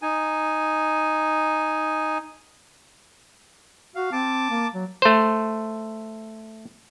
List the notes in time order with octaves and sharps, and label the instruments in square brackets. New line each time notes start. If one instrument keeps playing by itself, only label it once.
[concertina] D#4 G#5
[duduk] F#4 [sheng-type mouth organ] F5
[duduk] C4 [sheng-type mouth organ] A5 D6
[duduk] A#3
F#3
[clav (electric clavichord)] A3 C5